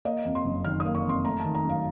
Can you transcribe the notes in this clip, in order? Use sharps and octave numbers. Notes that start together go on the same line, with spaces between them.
A#3 D#5
F2
C6
F#1
D#3 F6
D#6
A#3
C#6
F2 C6
A3 A#5
D#3 A5
A#5
F#2
F5